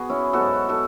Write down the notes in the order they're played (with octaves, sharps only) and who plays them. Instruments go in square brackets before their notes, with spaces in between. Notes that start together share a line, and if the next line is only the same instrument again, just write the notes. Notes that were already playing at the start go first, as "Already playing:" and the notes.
Already playing: [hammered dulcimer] B3 F#4 G#4
C#4 E4
G#2 F#3 B3 F#4 A4
F#4 A4